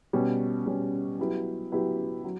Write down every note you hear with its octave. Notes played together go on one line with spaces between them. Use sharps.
B2 G3 C#4
B2 G3 C#4
F#3 B3 E4 G4
F#3 B3 E4 G4
F#3